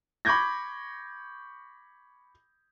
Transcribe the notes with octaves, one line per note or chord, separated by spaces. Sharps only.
B5 C#6 D6 G6 G#6 A#6